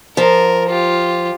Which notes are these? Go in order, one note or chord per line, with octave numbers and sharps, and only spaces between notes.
F3 A#4
F4 G4